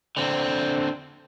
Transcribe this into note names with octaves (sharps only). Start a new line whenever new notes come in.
D3 C4